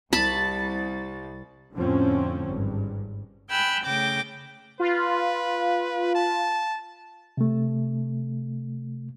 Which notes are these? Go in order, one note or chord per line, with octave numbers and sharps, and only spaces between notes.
C2 A5 B5 A6
F2 A2 D3 F3 C4 C#4
G#1 G2
G5 G#5 B5 E6 F#6
C#3 A3 G5 D6 A#6
F4 B4
A5
C3 A3